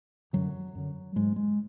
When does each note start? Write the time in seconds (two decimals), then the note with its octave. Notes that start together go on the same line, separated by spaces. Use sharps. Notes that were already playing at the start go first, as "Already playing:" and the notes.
0.33 F#2 D3 F#3
0.75 F#2 D3
1.16 G#2 G#3
1.36 G#3